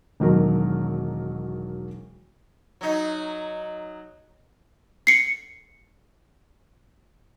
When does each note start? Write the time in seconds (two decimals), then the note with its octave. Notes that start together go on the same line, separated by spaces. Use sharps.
0.20 E1 D#3 F#3 A#4
2.81 F#3 D#4
5.07 C7 C#7